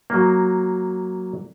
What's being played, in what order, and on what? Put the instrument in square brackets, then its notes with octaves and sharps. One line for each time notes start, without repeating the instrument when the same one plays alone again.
[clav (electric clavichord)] F#3 A#3